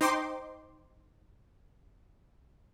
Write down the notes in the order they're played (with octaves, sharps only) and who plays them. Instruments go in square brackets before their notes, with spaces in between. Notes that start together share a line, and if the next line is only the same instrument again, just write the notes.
[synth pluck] D#4 C5 G5 C6 D6